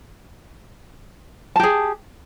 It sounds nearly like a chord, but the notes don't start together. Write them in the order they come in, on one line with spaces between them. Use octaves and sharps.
A5 G4 G#4